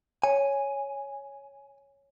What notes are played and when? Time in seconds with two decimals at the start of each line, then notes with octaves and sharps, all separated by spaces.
0.24 C#5 G#5